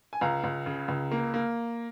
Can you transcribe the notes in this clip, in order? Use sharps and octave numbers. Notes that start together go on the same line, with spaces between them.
G#5
C#2 F5 A#5
C#2
C#3
C#2
A#3
A#3